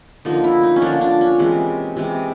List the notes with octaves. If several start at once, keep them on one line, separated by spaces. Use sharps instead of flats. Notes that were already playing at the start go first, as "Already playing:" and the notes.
D3 F3 A#3 D#4
E4
D#4
C#4
D3 F3 A#3 D4
D4
C#4
C3 E3 G#3
C3 E3 G#3